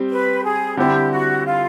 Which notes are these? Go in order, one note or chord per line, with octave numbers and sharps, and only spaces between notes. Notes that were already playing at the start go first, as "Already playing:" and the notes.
Already playing: G3 C4
B4
G#4
D3 G3 C4 E4 G4
F#4
F4